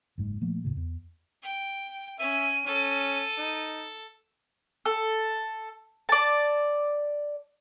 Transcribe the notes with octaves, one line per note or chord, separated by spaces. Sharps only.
F#1 G#2 G#3
A#2 F3 A3 A#3
D#2 A2 C#3
E2
G5
C#4 E5 D#7
C#4 A4
D#4
A4
D5 A5